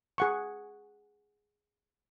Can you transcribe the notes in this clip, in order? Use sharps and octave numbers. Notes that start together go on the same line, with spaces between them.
G#4 F#5 C#6